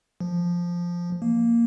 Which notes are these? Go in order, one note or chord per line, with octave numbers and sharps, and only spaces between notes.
F3
A#3